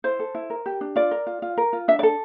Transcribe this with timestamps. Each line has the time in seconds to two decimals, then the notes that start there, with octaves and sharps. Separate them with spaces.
0.04 E4 C5
0.19 A4
0.35 E4
0.50 A#4
0.66 G4
0.81 D4
0.96 F4 D5
1.11 A#4
1.27 F4
1.42 F4
1.57 A#4
1.73 F4
1.88 D4 E5
1.99 D5
2.03 A4